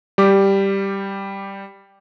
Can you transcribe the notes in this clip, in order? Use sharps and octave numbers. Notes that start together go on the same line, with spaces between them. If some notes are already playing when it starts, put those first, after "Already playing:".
G3 G4 D6